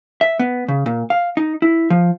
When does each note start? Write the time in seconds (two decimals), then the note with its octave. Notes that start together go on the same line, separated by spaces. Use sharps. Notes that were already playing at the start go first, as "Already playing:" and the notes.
0.21 E5
0.39 B3
0.68 C#3
0.86 A#2
1.10 F5
1.37 D#4
1.62 E4
1.90 F3